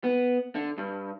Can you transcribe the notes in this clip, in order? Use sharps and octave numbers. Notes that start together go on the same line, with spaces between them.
B3
D3
G2